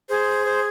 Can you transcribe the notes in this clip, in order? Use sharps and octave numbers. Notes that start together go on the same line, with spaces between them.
G#4 C5
C5